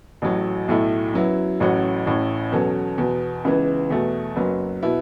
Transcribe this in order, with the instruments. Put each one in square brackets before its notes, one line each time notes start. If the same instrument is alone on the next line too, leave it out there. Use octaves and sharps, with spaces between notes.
[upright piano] A1 A2 F#3
B1 A2 A3 E4
F#2 F#3 B3 E4
A1 A2 F#3 C#4 F#4
A1 A2 A3 C#4
E2 B2 F#3 C#4 A4
E2 B2 B3
C#2 C#3 E3 B3
E2 B2 A3
F#1 F#2 F#3 B3
B2 B3 E4